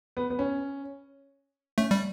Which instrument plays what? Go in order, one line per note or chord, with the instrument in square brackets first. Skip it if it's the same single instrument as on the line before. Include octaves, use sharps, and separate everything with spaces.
[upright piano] B3
B3
C#4
[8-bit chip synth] A3 [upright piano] C#4
[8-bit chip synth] G3